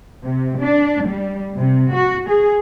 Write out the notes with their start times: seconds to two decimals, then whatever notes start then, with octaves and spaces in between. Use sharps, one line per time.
0.23 C3
0.59 D4
1.05 G3
1.57 C3
1.92 F#4
2.28 G#4